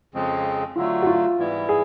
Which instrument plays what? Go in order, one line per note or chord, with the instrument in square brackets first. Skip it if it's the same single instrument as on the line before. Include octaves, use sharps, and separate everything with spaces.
[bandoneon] F2 C#3 F3 G#3 C4
[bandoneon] D3 F#3 A3 [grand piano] F4
[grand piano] F#4
F4
[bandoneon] G#2 E3 G3 B3 E4
[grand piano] G#4